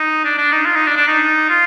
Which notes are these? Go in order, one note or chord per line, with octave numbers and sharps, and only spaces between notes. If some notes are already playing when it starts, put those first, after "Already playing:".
Already playing: D#4
D4
D4
D#4
F4
D#4
D4
D4
D#4
F4